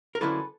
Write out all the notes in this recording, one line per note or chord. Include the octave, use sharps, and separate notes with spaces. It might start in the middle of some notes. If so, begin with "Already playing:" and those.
A#4
D3 F#3 A#3 C#4 E4 A4 B4